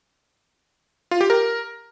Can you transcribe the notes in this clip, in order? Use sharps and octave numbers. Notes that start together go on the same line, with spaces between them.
F4
G4
A#4